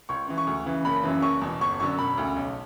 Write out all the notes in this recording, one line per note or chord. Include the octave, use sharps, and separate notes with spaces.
C#2 C#6
C#3 E3
C#6
D2
C#3 E3
F#1 B5
F#2 C#3 E3
F#1 C#6
E2 B2
G1 C#6
F#2 D3 C#6
E1 B5
D2 C#3
B1